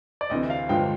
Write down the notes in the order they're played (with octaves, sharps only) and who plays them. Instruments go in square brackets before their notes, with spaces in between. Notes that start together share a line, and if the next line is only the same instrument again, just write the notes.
[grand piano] D5
[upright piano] D2 C3 E3 [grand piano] D#5
[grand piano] F5
[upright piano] G1 G2 D3 F3 G#3 [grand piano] G5